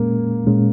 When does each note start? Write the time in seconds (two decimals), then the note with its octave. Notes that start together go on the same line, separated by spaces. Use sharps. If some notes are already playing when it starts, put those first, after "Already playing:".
Already playing: A#2 G#3 A#3 C#4
0.47 A#2 G#3 C#4